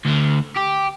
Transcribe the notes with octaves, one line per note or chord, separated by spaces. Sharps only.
D2 D3
G4